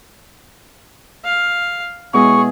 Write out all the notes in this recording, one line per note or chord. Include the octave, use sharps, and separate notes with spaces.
F5
B2 G#3 E4 G#4 C#6